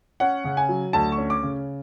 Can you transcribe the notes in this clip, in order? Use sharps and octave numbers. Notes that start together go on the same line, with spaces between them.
C#4 F#5
C#3
G#5
F#3
D2 A5
C#6
C#4
D6
C#3